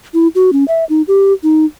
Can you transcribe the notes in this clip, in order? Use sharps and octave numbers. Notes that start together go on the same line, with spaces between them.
E4
F#4
C#4
E5
D#4
G4
D#4